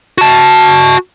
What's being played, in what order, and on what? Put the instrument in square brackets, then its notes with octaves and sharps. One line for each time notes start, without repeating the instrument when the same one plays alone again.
[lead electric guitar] F#4 A5